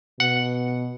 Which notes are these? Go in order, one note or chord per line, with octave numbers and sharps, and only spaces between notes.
B2 F#5